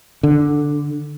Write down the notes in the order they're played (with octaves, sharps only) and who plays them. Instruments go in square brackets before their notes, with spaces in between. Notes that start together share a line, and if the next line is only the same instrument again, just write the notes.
[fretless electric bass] D3